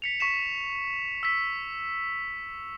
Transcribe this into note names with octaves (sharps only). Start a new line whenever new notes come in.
B6 C#7 F7
C#6 B6 E7
E6 B6